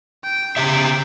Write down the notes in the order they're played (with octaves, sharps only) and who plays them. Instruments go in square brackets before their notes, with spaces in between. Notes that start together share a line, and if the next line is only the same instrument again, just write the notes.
[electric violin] G5
[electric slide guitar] C#3 G4 E5